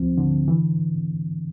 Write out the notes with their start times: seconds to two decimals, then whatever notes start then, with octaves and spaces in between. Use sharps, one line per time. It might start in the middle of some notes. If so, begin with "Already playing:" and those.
Already playing: D2 F3 C4
0.18 D3
0.48 E3